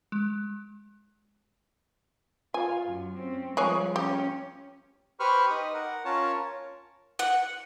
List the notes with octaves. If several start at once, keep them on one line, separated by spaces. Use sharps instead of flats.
G#3
F4 G#5
F#2
C4 C#4
F3 G3 G#3 G#4 C#5
C#4 G4
G4 B4 C5 B5 C#6 F6
D#4 D#6
A#4 F#5
C#4 F4 A#4 C#5 A5
F#5